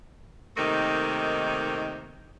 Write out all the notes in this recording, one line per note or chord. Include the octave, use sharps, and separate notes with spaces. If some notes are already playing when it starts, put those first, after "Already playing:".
C3 D#3 A3 A#3 D#4